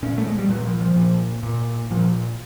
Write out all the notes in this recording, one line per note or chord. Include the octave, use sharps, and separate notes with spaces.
A#2 C#4
A3
G#3
G3
A#2 F#3
F3
F3
A#2
A#2
A#2 F3